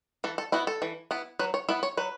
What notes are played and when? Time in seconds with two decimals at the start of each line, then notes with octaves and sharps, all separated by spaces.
0.24 E3 A4
0.38 A4
0.52 B3 E4 F#4
0.67 A4
0.82 E3
1.11 B3 E4
1.39 F#3 B4
1.54 C#5
1.69 B3 E4 E5
1.83 C#5
1.97 F#3 B4